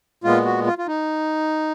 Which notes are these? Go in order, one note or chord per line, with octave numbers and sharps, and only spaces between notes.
A#2 G#3 B3 F4
F#4
F4
F4
D#4